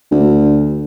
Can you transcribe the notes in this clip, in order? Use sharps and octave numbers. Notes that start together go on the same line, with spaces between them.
D2